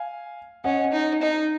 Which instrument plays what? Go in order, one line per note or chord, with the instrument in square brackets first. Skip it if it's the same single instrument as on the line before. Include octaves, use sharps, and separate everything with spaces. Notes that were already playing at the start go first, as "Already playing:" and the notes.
Already playing: [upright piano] F5 G#5
[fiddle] C#4 [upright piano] D#5 F#5
[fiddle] D#4
D#4